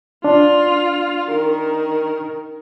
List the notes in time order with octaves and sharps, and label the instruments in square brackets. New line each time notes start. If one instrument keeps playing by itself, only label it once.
[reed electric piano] D4 [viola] F4
[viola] D#3 A#4